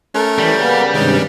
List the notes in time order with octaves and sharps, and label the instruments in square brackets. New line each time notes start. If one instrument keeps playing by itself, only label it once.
[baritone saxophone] A3 [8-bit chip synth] C#4 A#4
[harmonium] E3 [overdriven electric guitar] G3
[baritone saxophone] C#3 [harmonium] A#3 B3
[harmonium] G2 C3 [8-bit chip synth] D#3 G#3 C#4